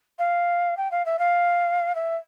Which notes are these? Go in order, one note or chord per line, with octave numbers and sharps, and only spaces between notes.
F5
G5
F5
E5
F5
E5